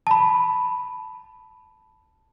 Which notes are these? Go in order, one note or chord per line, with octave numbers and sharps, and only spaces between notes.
A5 B5